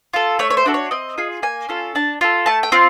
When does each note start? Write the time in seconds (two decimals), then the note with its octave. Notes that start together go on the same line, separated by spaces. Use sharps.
0.13 F4 A4
0.39 A3 C#5
0.50 C#5
0.57 C5
0.66 D4 F#4 A4
0.74 C#5
0.91 C4 D#5
1.18 F4 G#4
1.43 A#3 G#5
1.69 C#4 F4 A4
1.95 D4 A5
2.21 F4 A4
2.46 A3 A5
2.63 G5
2.72 C4 F4